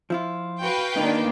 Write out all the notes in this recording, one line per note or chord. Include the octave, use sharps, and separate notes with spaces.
F3 E4 F4
F#4 B4 F5 G5
D#3 A#3 D4 D#4